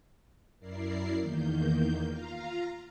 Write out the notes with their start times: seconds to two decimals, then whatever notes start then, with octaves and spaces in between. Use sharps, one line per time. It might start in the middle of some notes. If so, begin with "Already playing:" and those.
0.60 F#2 E4 A#4 D5 C7
1.19 E2 D#3 A#3 G6
2.07 F4 F5 A#5